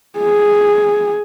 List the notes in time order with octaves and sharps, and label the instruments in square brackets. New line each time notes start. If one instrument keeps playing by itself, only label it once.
[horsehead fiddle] G#4